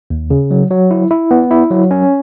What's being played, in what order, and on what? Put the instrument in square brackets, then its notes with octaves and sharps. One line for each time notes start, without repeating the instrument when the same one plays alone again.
[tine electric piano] D#2
C#3
F#3
F#3
E4
E4
B3
E4
F#3
C#4